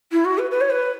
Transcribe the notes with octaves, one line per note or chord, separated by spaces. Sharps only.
E4
F#4
B4
B4
C#5
B4